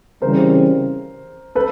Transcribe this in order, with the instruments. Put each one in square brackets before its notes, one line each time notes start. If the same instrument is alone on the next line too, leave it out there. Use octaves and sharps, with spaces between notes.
[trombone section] C#3 E3 G3 C4 [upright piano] A#4 C5
[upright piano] A4 B4